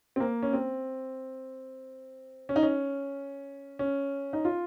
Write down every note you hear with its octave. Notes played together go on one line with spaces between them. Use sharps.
C4
A#3
C#4
C4
C#4
D#4
C#4
C#4
D#4
F4